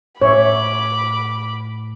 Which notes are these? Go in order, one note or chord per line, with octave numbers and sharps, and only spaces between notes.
A2 C#5 E5 B5 D6